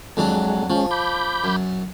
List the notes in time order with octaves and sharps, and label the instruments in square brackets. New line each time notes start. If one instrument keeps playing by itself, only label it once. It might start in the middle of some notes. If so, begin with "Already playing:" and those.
[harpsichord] F2 F#3 D4 [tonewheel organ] G#3
[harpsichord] F3 [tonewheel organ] G#3 C#4
[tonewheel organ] B5 D6 G6
[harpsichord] F#2